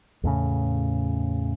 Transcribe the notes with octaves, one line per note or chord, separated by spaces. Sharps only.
E2 A2 C#3